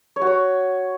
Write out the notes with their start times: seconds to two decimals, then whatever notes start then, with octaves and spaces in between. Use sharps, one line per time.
0.16 C#5
0.22 F#4
0.27 C#5